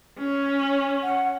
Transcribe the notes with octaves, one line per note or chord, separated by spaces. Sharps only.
C#4
F#5